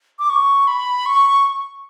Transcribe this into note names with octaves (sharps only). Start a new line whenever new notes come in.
D6
C#6
B5
C#6